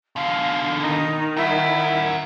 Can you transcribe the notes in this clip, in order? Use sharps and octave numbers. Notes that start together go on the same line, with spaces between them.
B2 D3 F5
D#3 D#4
E4 A#4 F#5